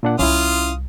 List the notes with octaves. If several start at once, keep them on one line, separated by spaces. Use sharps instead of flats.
A#2 D4 F#5
C2 C#4 E4 F4 F5 D#6